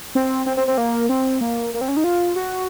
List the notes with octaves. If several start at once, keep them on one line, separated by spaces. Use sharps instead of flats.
C4
C4
C4
C4
A#3
C4
A#3
A#3
C4
C#4
D#4
F4
F#4